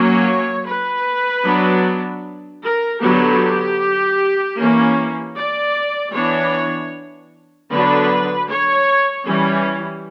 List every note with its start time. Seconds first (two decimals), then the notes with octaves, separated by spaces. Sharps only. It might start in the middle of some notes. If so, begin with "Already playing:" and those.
Already playing: F#3 A#3 C#4 C#5
0.65 B4
1.44 F#3 B3 D4
2.62 A#4
3.00 D3 F#3 B3 G4
4.57 E3 A#3 C#4
5.35 D5
6.13 E3 B3 D4 C#5
7.70 D3 F#3 B3 D4 B4
8.49 C#5
9.26 E3 G3 C#4